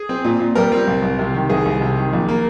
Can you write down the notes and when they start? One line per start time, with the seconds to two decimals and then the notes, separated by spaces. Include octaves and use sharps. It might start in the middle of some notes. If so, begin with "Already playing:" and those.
Already playing: G#4
0.09 C4
0.25 A#2
0.40 A#2
0.55 G3 A#4
0.72 C4
0.87 C2
1.02 C2
1.19 C3
1.34 D#3
1.50 C2 G#4
1.65 C2
1.81 C3
1.97 D#3
2.13 A#1
2.29 A#3